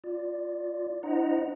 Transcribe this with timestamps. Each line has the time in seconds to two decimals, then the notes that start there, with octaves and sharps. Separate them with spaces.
0.04 F4 D5
1.03 D4 E4 C5 D#5 F#5 A#5